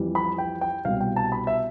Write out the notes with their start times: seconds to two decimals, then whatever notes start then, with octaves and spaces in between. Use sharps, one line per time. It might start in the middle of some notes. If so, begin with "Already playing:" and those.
Already playing: F2 E3 G3
0.15 B5
0.38 G5
0.61 G5
0.85 C2 B2 G3 F5
1.01 G5
1.16 A5
1.32 B5
1.47 E5